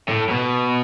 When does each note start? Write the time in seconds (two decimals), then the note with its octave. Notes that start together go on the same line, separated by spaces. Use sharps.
0.09 A2
0.29 B2